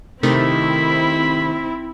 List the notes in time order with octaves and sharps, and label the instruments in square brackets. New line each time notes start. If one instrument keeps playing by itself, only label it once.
[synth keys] C3 D#3 A3 [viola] C4 E4 [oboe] B5